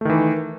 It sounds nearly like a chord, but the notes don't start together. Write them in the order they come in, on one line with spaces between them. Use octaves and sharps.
A3 D#3 E3